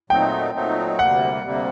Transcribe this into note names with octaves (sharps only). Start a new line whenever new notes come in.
A#2 F#3 A3 C4 D#4 G5
A#2 F#3 A3 C4 D#4
D2 C3 G3 A#3 F#5
D2 C3 G3 A#3